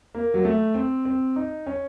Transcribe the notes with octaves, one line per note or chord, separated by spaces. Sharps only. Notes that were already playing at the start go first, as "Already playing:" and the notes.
A#3
F#3
A3
C4
C4
D#4
C#4